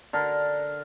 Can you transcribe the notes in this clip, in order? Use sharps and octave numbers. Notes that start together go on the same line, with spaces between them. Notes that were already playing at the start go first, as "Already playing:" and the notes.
D3 A#4